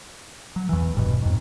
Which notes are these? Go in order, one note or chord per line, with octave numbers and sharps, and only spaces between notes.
F#3
E2 E3
E1 G2 B2
F2 G#2